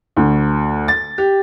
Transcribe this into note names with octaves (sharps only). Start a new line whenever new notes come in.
D2
A6
G4